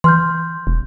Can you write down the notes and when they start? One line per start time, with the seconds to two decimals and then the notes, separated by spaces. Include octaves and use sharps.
0.04 E3 C6 F6 G6
0.67 E1